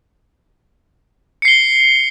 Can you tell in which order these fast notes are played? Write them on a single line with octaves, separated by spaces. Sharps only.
C#7 C7 G7